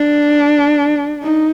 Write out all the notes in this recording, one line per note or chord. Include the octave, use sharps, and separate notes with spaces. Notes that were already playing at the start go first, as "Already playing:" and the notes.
Already playing: D4
D#4